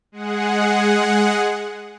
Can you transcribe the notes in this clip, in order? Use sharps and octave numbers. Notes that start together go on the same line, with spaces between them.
G#3 G#4 F#5